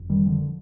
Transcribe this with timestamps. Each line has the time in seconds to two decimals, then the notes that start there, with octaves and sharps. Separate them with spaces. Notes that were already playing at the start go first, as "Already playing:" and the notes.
Already playing: F1
0.10 D#3 G3
0.26 D3 F3